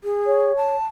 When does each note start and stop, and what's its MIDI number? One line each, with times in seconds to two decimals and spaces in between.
0.04 0.55 68
0.26 0.76 73
0.57 0.86 81